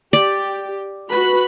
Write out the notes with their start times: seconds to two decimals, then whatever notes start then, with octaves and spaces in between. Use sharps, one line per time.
0.13 G4 D5
1.09 F#4 B4 B5